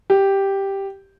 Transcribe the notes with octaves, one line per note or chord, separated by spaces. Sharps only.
G4